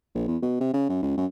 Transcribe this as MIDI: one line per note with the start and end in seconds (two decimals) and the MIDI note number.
0.15 0.24 34
0.27 0.37 40
0.42 0.55 47
0.60 0.71 48
0.74 0.85 49
0.89 0.99 42
1.02 1.15 37
1.17 1.26 42